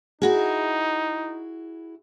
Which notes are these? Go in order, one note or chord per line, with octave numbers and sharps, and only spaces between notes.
D#4 E4 F#4 G#4